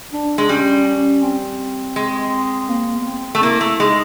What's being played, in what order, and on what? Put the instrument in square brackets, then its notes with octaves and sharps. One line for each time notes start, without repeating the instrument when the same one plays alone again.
[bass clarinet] D4
[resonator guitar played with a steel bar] G#3 [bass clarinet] D4
[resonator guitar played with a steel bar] G3 [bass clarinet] C#4
[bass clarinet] C#4
C4
[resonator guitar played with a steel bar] G#3
[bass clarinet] A#3
B3
C4
[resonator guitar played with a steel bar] A3
[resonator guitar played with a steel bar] A#3 [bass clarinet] E4
[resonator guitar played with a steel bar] A3
[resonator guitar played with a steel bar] G#3 [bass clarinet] D#4